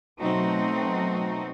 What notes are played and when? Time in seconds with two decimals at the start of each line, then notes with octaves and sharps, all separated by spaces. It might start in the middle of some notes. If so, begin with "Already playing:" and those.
0.21 B2 F#3 A3 C4 D#4 F#4